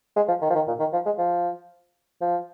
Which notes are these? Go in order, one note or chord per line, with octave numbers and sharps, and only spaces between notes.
G#3
F3
D#3
F3
D#3
A#2
D#3
F3
G#3
F3
F3